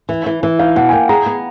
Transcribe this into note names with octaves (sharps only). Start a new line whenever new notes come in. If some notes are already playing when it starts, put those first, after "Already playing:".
E3
E3
E3
D#4 F5
B2 F#5
G#5
A#3 G5
G#4 A#5
B3